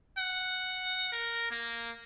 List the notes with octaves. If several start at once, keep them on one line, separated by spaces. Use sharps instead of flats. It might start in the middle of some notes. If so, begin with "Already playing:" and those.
F#5
A#4
A#3